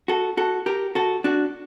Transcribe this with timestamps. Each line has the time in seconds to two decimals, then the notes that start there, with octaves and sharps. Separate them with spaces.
0.08 F#4 A4
0.37 F#4 A4
0.66 G4 A#4
0.95 F#4 A4
1.24 D4 F#4